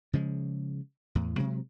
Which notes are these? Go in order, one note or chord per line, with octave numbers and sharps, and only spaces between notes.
C#3 F3 G#3
E2 A2
C3 F#3 G#3 C4